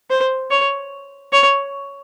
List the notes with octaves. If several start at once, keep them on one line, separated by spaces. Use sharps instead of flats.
C5
C#5
C#5